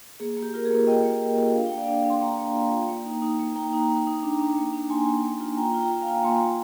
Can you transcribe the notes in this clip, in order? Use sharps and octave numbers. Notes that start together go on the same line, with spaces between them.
A#3 G#4
A#3
G4
F4 A#4
G#4
A#3
A#3 D#5 G5
A#3
F4
A#3
D4 F5
A#3 G5
D5 F5
D4
D4
C6
A#3 G5 A#5
A#3
F4
A#3
A#3
D#4
D#4
A#3
A#3 G5 A#5
D#4
D#4
D#4
D4
D4
A#3
D4
A#3 G#5 C6
A#3
A#3
F4
F4 G5 A#5
F4
G5 A#5
F4
F5 G#5
F4
A#3 G#5 C6
A#3